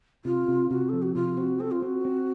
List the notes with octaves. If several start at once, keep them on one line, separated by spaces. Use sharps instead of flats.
C3 F4
C3
C3 F#4
F3 A4
F#4
C3 F4
C4 F#4
C4 A4
F4
C4 F#4
C4